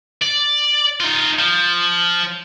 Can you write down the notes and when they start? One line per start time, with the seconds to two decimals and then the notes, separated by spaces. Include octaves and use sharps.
0.22 D5
1.00 D#4 F4
1.38 F3